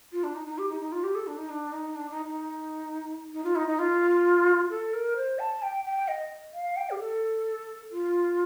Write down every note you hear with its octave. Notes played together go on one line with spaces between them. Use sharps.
F4
D4
D#4
D#4
G4
D#4
D#4
F4
G4
A4
D4
D#4
D4
D#4
D4
D#4
D#4
D#4
F4
D#4
D#4
F4
A4
A#4
C5
A5
G5
G5
D#5
F5
G5
G4
A4
F4